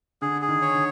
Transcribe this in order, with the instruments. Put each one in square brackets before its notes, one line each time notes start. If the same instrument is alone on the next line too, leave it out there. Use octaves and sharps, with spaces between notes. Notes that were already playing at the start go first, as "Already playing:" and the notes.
[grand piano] D3 [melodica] G#4
[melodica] G#4
[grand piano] D#3
[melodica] C#5
[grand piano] D3